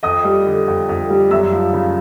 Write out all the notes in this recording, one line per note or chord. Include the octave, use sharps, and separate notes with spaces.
F2 D#5 D#6
G3
D3
F2
F2
G3
F#2 E5 E6
F3
C#3